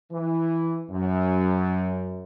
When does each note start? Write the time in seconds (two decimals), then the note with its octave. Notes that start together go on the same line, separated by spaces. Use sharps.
0.12 E3
0.90 F#2